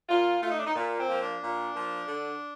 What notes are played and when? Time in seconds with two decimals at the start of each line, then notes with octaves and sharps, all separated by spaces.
0.09 A#2 F4
0.42 A3 F4
0.50 D#4
0.59 D4
0.66 D#4
0.75 A#2
0.97 C4
1.08 F3 A#3
1.20 D4
1.42 A#2
1.74 F3 A#3
2.07 D3